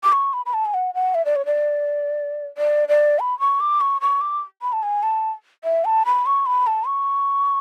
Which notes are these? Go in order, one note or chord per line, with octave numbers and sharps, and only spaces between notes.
D6
C#6
B5
B5
A5
G#5
F#5
F#5
E5
D5
C#5
D5
D5
D5
B5
C#6
D6
C#6
C#6
D6
B5
A5
G#5
A5
E5
A5
B5
C#6
B5
A5
C#6